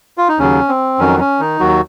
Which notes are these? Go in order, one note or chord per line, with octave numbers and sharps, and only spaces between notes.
F4
D#4
D#2 C#3 F#3 C#4
C4
F2 D#3 F#3 C#4
C#4
D#3 D#4
D#2 D#3 F#3 F#4